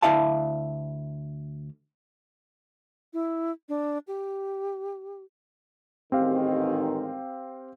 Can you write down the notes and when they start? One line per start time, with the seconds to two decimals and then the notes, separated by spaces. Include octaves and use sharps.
0.02 D2 E4 D5 E5 F5 A5
3.13 E4
3.69 D4
4.07 G4
6.12 A1 G#2 D#3 C4 G4 F5